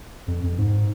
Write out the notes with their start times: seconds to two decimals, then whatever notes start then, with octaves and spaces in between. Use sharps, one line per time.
0.28 F2
0.43 F2
0.58 G#2